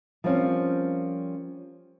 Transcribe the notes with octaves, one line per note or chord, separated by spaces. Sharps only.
F3 G3 A#3 C4 C#4